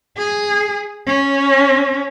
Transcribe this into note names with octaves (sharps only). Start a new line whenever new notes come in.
G#4
C#4